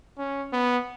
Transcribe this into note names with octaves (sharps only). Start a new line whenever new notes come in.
C#4
B3